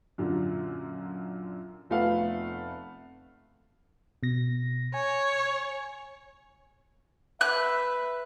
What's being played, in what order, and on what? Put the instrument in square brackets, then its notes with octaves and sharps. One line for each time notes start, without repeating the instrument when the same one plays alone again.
[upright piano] F#2 A#2 D3
F1 F3 A3 B3 F5 F#5
[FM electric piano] B2 A#6
[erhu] C#5 [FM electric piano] G#5
[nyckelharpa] B4 [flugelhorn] E5 [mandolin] F#6